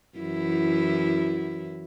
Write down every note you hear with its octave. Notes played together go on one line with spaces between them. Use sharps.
F#2 E3 E4